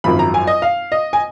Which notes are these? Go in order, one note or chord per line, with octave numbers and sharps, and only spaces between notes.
G#1 F#2 F3 B5
A#5
G#5
D#5
F5
D#5
G#5